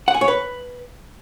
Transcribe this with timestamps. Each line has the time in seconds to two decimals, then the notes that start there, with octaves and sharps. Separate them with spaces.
0.08 F#5
0.15 G#5
0.21 C#5
0.28 B4